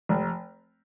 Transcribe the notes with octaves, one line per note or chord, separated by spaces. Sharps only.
F1